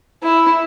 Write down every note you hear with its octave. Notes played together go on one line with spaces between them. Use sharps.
E4